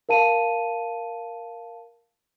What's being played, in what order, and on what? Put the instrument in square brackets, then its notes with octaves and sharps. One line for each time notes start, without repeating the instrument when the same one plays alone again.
[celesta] A#4 F5 A5 D#7